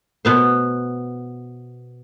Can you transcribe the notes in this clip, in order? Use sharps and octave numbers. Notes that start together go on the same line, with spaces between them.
B2 B3 C5